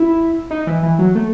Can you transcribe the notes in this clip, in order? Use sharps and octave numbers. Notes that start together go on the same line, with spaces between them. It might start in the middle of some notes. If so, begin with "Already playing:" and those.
Already playing: E4
D#4
E3
E3
F#3
A3